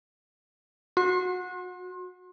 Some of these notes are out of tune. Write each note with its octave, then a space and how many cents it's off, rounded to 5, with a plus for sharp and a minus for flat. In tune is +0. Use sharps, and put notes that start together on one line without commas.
F#4 -25 C6 +35